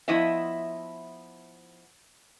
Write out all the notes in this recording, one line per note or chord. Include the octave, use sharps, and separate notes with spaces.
F3 B3 E4 D#5 E5